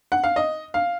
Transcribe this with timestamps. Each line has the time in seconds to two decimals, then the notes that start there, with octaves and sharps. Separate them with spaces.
0.12 F#5
0.24 F5
0.36 D#5
0.74 F5